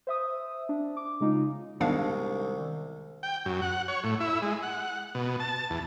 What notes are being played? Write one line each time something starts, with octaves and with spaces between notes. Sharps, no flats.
C5 E5 D#6
D4
D6
C#3 G#3 D#4 F4
C2 D#3 G3 G#3 B3 D4 F5
G5
F#2
F#5
C#5
A2
E4
G#3
F#5
B2
A5
E2